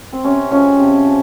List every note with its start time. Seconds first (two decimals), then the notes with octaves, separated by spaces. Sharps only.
0.13 C4
0.24 C3 C#4
0.51 F3 G#3 C#4
0.79 C3
1.06 F3